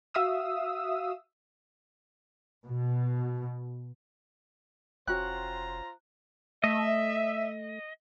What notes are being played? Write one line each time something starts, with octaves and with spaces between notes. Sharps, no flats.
F#4 E5 F5 D#6 E6
B2
F1 C#4 F4 F#4 C5 G5 A#5 F#6
A3 D#5 E5